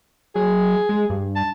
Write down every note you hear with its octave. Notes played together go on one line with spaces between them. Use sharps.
F#3 G#4
G#3
G2
A5